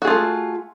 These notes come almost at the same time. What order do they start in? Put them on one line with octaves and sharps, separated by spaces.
F#4 G#4 F4 A3